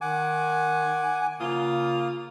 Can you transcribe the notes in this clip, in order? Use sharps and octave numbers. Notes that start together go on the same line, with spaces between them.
D#3 F#5 G#5 D6
C#3 A#3 F4 D#6